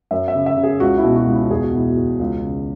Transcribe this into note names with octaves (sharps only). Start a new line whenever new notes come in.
F#2 E5
E5
C#3
E5
C#3
G#4
C#2 F#4
E4
B2
F#4
C#2
E4
E2 G#4
F#4
B2 E4
F#4
E2
C#2
C#3